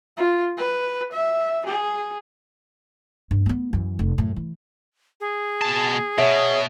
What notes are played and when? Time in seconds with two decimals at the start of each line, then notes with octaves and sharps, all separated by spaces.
0.17 F4
0.57 B4
1.12 E5
1.66 G#4
3.31 G2
3.46 A#3 B3
3.73 F#2 E3
3.99 F1
4.18 F#2 A2
4.36 E3
5.20 G#4
5.61 B2 A5
6.18 B2 C#5 E5